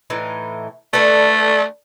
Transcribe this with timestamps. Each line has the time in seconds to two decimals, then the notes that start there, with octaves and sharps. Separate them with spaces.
0.10 A2 E3 D#4
0.93 A3 A4 B4 D5